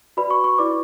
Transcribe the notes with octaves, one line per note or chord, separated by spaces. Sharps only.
F#4 B4 D5 B5
C#6
C#6
E4 B4 D5 D6